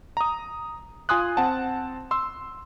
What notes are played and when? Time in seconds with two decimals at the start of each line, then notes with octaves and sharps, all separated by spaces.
0.17 A#5 D#6
1.09 F4 G#5 C6 D#6 F#6
1.37 C4 F#5 A5
2.11 C6 E6